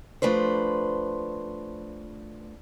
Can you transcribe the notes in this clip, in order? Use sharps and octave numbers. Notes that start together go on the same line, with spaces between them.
F3 A3 D4 B4 C5